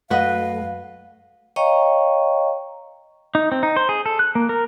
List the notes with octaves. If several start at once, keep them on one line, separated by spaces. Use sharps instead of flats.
F#2 A3 F#4 B4 D#5 F5
C#5 D#5 F5 G5 A#5 C#6
D#4
C4
D#4
C5
G#4
A4
F#6
A#3
A#4